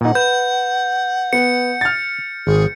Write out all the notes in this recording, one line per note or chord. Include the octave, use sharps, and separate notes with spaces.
A#2 D#4 F#5
B4 G6
B3 C#7
F6 A6
G#1 G#4